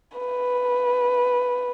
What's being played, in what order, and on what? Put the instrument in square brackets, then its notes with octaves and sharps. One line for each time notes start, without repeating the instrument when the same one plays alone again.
[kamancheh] B4